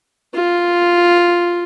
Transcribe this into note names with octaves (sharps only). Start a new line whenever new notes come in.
F4